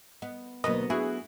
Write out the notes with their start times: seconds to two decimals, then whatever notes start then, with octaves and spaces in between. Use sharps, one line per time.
0.22 B3 D#5
0.64 D2 B2 F#3 A#3 B3 A#4 B4 D#5
0.90 D4 E4 F#4 G#4 F#6